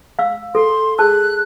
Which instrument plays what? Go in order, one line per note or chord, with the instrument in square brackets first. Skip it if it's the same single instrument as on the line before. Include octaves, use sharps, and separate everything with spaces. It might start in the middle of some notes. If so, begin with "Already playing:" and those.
[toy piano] F5 E6
[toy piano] A4 [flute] C6
[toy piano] G#4 A5 E6 [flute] F#6